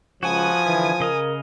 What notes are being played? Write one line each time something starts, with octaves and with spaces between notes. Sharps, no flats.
C#2 F3 F#4 B4 G#5 D#6
D3 E3 E4
C#3 A#4 D#5 F5